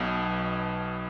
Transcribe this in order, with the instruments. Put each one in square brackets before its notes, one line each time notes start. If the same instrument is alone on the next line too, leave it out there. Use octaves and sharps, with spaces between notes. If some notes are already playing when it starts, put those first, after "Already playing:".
Already playing: [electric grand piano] B1 B2